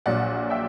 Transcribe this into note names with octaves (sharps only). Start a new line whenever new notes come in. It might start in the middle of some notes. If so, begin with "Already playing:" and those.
A#1 A#2 F#3 D5 F#5
E5 G5